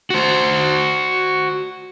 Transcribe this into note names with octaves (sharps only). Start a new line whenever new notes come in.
F#4 C5